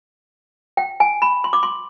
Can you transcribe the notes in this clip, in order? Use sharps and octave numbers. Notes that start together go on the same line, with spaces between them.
G5
G#5
B5
C6
D6
C6